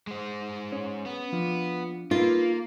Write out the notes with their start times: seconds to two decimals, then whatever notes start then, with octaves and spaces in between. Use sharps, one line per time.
0.07 G#3 C5
0.72 C#4 C#5
1.06 B3
1.32 F3 D4 F4
2.11 A#3 D#4 F4 A4 B4